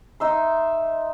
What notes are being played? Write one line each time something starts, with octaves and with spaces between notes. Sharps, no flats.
D#4 E5 C6